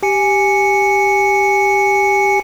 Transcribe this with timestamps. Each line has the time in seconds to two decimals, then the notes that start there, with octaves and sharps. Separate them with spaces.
0.03 G4 G#5 C#7